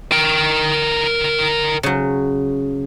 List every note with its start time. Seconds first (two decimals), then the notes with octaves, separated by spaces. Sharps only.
0.12 A#4 G5
1.83 C#3 F#3